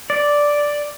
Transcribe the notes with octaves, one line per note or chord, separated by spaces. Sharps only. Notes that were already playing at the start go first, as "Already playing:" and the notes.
D5